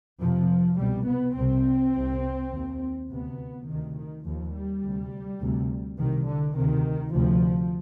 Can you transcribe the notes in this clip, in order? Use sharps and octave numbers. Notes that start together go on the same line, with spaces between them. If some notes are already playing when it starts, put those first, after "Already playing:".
F2 C3 F3
C2 B2 G3
B3
C2 C3 C4
C2 C3
D#2
D2 C3 B3
D2 C3 D#3
D#3
D#2 F3
G3
D2 C3
D2 C3
C2 C3 D#3
D3
D2 C3 D#3
D2 C3 F3